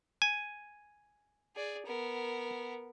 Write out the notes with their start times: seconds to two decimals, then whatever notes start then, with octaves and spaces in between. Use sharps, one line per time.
0.22 G#5
1.56 G#4 D5
1.86 B3 A#4